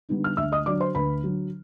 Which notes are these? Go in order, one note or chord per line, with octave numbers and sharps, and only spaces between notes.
D3 G3 B3 D#4
F6
D2 E5 E6
D#5 D#6
D3 F#3 D5 D6
C5 C6
D2 B4 B5
D3 F#3